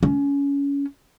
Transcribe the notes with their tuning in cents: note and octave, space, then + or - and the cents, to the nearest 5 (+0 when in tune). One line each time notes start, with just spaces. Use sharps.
C#4 +25